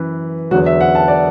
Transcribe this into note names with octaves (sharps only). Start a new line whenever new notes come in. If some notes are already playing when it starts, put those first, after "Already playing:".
Already playing: F#2 E3 B4
E2 D3 F#3 F#4
E5
F#5
A5
D5